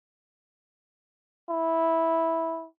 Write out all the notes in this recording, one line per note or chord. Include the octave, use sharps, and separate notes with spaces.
E4